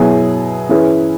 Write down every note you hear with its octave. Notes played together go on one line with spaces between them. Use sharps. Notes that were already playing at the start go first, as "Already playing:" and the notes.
Already playing: B2 F#3 E4 G#4
E3 C#4 E4 G#4 B4